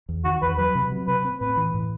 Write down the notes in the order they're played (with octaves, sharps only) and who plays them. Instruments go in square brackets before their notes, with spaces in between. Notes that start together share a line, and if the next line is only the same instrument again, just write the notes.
[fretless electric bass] E2
[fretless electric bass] D#3 [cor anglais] F#4
[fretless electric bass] E2 [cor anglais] B4
[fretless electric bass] F#3 [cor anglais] B4
[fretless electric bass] C3
F#3
[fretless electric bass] C3 [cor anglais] B4
[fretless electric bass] C4
[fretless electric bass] A2 [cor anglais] B4
[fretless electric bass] E3
A2